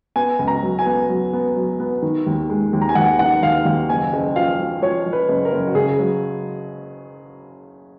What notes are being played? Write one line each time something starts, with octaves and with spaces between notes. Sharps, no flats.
B3 G#5
C#2
A#5
F#3
G#5
B3
F#3
B3
F#3
B3
D#3
D#2
G#3
D#2
A#5
G#5
D#2 F#5
D#3 F#5
D#2 F5
D#2 F5
F#1 G#5
F#1
F3 F5
F3
F3 C#5
F3
B4
F#1
A#4
F#1
F#4
C#3 G#4
F#3